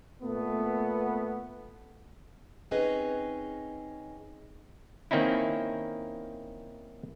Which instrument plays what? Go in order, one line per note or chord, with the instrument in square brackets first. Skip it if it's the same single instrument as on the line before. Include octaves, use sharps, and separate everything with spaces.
[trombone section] A#2 A3 B3
[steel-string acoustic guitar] C4 C#4 D#4 G#4 B4 D#5
[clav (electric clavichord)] D#3 A#3 C4 C#4 D#4 E4